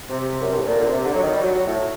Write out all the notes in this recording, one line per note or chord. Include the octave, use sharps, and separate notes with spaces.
C3
F#2
G2
A2
A#2
D3
C3
D3
F#3
D#3
G3
F#3
F#3
A2